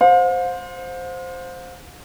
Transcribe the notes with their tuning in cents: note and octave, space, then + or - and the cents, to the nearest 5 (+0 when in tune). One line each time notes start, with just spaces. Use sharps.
C5 +0 F5 +40